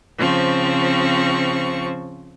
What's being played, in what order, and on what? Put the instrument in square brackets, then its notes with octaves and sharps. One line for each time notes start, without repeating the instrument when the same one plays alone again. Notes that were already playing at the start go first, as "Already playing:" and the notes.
[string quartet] C#3 F3 C4 C#6